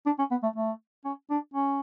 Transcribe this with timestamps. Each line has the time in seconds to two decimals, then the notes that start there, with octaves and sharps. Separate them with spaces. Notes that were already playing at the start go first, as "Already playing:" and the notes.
0.06 D4
0.19 C#4
0.31 B3
0.43 A3
0.56 A3
1.05 C#4
1.30 D4
1.54 C#4